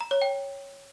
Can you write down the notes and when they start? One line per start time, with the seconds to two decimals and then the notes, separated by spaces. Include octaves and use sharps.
0.01 A#5
0.11 C#5
0.22 G5